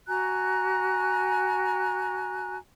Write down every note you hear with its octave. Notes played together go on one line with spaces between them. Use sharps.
F#4 G#5 A#5 F#6